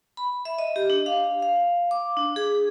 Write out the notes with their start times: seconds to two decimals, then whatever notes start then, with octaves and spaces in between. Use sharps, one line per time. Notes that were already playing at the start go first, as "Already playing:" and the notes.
0.17 B5
0.45 E5
0.58 D#5
0.76 G4
0.90 D4
1.06 F5
1.42 F5
1.91 D6
2.17 D4
2.36 G#4